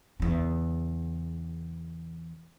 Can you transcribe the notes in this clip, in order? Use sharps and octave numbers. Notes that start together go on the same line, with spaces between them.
E2 C#3